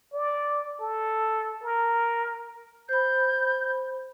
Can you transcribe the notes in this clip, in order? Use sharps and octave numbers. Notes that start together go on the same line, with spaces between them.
D5
A4
A#4
C5 B5 G6